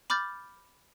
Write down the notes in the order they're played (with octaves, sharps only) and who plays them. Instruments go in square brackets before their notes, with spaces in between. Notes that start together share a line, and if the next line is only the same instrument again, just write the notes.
[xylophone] B5 D6 F6 G6 A6